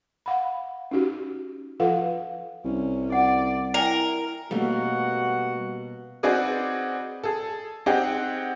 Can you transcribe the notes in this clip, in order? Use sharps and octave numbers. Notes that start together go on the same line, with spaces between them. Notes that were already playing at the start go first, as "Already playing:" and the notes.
F5 F#5 B5
C#4 D#4 F#4 G4
F3 F4 A4 B4 F5 F#5
C2 C#4
D5 F#5
E4 A#4 D5 G5 G#5
B2 G3 A3 A#3 C#4 F#4 F#5
C4 D#4 F#4 G#4 B4 D5
G#4 A4
C4 D#4 G4 G#4 F#5 G5